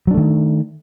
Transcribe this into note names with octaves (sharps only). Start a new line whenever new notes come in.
D#3 F#3 A3 D4